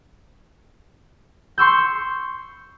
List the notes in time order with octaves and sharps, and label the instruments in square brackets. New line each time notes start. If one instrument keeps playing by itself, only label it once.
[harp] C6 C#6 E6 G6